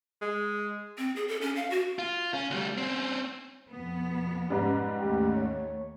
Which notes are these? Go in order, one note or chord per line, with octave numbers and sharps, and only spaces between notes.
G#3
C4
G#4
A4
C#4
F5
F#4
F4
C#4
D2 G3
C4 C#4
F2 B2 B3
G#2 C#3 G3 B4
D#2 A3 G4
C#5